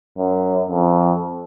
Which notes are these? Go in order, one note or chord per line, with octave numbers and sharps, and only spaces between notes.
F#2
F2